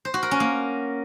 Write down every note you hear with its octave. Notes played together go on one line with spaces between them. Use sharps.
C5
F#4
A#4
C#4
A#3